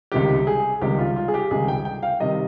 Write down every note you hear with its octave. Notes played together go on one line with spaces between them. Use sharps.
C#2 C3 D#3 G3 G4
G#4
C#2 C3 D#3 G3 G4
F4
F4
G#4
G4
C#2 C3 D#3 G3 G#4
G5
G5
F5
C3 D#3 G3 D#5